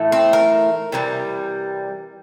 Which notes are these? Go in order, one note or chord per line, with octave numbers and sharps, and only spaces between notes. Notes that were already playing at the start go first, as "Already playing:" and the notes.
Already playing: A2 E3 A3
C4
A#4
C3 E3 G3